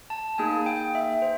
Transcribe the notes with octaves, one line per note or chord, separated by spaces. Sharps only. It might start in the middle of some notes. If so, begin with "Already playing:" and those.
A5
A#3 D#4 G#4 G#5
G5
E5
C5